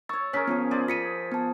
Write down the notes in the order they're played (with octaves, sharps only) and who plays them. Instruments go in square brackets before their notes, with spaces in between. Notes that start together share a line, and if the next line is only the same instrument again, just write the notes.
[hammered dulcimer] C#5 C#6 [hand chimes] E6 A6
[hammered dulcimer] C#4 G#4 A#4 [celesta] C#5 B6
[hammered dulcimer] F3 G#4 [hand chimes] B3 C#4
[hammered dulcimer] G#4 C5 D5
[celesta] F4 C#7 D#7 [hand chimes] B6
[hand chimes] B3 A5